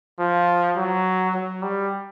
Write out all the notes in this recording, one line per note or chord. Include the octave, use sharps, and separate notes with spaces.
F3
F#3
F#3
G3